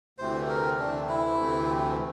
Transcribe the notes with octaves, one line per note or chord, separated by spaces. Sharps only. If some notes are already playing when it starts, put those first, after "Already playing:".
D2 C3 E3 A3 C4 C5
A#4
D2 C3 E3 A3 C4 D4
E4
D2 C3 E3 A3 C4